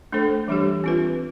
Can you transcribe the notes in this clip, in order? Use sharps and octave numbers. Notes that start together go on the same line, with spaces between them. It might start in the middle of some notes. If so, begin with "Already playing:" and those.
A3 D4 A4 C5
E3 G3 D4 G4
C4 F4 B4